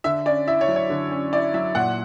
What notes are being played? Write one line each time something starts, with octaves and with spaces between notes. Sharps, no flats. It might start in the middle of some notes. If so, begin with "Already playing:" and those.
D3 E5
C#4 D5
E4 E5
C#5
F#3
C#5
D3
C#4
E4 D5
F#3 E5
A#2 F#5